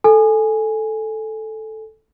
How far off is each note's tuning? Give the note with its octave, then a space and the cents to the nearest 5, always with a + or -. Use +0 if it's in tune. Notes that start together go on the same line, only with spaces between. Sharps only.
A4 -5 G#5 +0